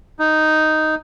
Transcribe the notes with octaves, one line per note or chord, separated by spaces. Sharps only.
D#4